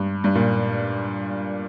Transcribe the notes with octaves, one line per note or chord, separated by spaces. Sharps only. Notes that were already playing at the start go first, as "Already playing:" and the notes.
Already playing: G2
G2
A#2